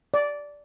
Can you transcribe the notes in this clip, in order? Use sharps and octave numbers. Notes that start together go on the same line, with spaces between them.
D5